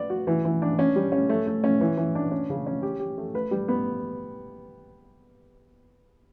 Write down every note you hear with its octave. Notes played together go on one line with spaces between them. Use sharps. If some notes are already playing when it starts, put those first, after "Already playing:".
Already playing: B4 D5
F#4
E3
E3
D4
C#4
G3
C#4
A3
A3
C#4
E3
E3
D4
C#4
C#3
C#4
G4
G4
A3
B4
G3
B3